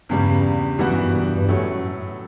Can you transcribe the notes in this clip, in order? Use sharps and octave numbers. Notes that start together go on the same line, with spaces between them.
E2 G2 C#3 G3
F#2 E3 G3 B3 F#4
F#2
G2
B2
G2
G2
F#2 A2 F#3 A3 C#4